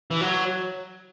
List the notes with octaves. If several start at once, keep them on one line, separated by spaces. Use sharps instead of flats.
E3
F#3